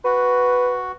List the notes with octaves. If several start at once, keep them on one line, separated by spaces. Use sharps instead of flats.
F#4 B4